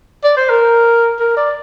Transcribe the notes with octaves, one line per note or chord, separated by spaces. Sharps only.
D5
C5
A#4
A#4
D5